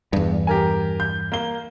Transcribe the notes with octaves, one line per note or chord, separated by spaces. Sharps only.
E2 G2
G4 A#4 G#5
G6
A#3 G7